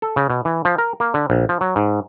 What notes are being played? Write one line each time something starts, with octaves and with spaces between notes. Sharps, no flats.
A4
C#3
B2
E3
F3
A#4
A#3
D3
A#1
F3
F#3
G#2